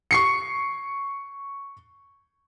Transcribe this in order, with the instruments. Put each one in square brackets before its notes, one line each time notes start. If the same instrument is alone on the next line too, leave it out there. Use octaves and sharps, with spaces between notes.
[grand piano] C#6 C7 C#7